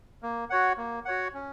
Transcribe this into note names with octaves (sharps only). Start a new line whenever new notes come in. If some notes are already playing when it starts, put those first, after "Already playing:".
A#3
F#4 C#5 F#5
A#3
F#4 C#5 F#5
C#4